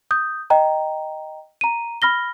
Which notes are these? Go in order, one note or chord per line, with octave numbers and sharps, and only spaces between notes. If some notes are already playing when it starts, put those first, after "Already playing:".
D#6 G6
D#5 G5 A#5
A#5 D#7
B5 F6 A#6 G7